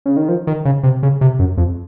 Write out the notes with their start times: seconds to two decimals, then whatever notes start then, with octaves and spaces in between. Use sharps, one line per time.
0.06 C#3
0.17 D#3
0.29 F3
0.47 D#3
0.65 C#3
0.83 C3
1.03 C#3
1.21 C3
1.39 F#2
1.57 F2